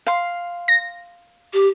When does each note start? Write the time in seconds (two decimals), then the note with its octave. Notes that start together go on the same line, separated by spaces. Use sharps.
0.07 F5 C6
0.68 A#6
1.53 G4